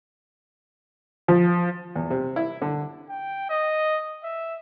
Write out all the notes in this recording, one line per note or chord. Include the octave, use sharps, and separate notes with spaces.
F3
E2
C3
E4
D3
G5
D#5
E5